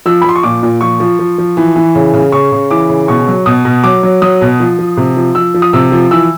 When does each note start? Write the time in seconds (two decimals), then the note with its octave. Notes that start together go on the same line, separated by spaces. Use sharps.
0.06 F3 E6
0.22 B5
0.24 F3 C6
0.36 C#6
0.43 A#2 D6
0.63 A#2
0.81 F3 C#6
1.00 F3
1.19 F3
1.38 F3
1.57 E3
1.76 E3
1.95 C#3
2.13 C#3
2.32 C#3 C#6
2.52 C#3
2.70 E3 D6
2.89 C#3
3.08 B2 C#6
3.28 F#3
3.46 B2 D#6
3.65 B2
3.84 F#3 D6
4.03 F#3
4.22 F#3 D#6
4.41 B2
4.60 F3
4.79 F3
4.97 C3
5.17 F3
5.35 F3 E6
5.54 F3
5.62 D#6
5.73 C3 E6
5.92 F3
6.11 E3 E6